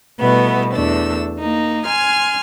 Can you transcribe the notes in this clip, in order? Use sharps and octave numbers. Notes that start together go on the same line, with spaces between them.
B2 G3 A3 B3 E4
E2 A3 D4 E6
A#3 D#4
G#5 C6 F6 G#6